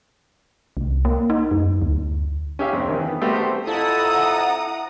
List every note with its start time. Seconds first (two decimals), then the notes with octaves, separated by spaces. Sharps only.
0.77 C2
1.05 A#3
1.30 D#4
1.51 F#2
1.82 D2
2.59 C#4 G4 E5 F5
2.73 F2 C3 C4
2.88 D#3 E3
3.08 B3
3.21 G3 A3 B3 C4 F#4 G4
3.34 G4 A4 C5
3.67 F2 E4 A4 F#5 A#5 D#6